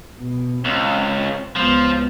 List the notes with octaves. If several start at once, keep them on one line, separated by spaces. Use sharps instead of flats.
B2
C#2 C4
C#2 F3 B3